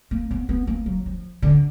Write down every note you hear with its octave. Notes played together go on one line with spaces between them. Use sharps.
A#3
B3
B3
A#3
F#3
F3
D3